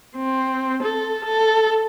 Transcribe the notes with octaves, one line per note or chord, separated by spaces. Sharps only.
C4
A4
A4